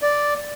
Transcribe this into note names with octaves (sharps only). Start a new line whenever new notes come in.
D5